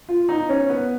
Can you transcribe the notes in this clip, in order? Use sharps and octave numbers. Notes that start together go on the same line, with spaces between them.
F4
D#4
C#4
B3